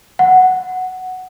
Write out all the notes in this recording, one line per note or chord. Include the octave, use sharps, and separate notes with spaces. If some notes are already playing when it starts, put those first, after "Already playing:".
F#5